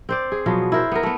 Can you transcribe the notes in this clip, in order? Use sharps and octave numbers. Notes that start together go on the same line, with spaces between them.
C4 C5 D5
G#4
B2 F3 F#3 B3
E4 A#4 C5
B3 A#4
A3 B3